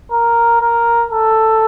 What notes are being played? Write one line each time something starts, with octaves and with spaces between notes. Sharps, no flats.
A#4
A#4
A4